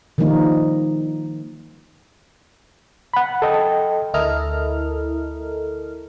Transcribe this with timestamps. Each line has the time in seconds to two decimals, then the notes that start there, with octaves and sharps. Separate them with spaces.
0.18 D#3 F3 G3 A#3 D#4
3.14 F#5 B5
3.42 A4 D#5 G5
4.14 D2 E4 A4 A#4 D#5 F6